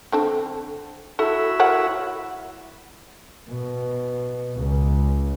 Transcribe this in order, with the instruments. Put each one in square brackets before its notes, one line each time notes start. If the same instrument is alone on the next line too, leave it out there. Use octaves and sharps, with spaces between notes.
[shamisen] D3 C4 A4
[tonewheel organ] E4 F#4 E5 [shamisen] A4
[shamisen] A#4 C#5 F#5
[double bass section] B2
C#2